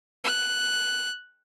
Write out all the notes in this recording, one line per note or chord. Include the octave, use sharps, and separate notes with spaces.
F#6